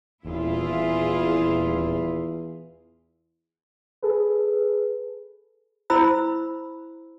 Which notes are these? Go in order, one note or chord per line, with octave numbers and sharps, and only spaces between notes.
D#1 E2 E4 F4 G#4
G#4 A4 B4
E4 C5 B5 E6